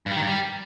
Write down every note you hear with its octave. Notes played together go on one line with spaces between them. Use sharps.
G2
G3
D#3
G2
G3